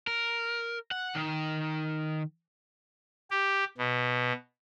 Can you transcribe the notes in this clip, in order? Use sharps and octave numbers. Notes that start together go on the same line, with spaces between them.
A#4
F#5
D#3
G4
B2